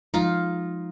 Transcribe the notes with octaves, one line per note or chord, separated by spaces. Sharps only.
F3 G#3 D#4 F4